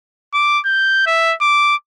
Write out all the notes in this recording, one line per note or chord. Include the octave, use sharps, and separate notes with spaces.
D6
G6
E5
D6